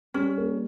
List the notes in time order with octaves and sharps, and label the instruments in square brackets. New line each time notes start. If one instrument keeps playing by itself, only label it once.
[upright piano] G3 [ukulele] C#4
[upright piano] A#3